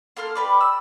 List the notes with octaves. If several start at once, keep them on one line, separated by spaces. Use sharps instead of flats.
A#3 A4 C6 F6
G4 B4 D5
E6